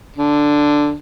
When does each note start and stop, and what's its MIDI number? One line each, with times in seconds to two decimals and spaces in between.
0.16 0.95 50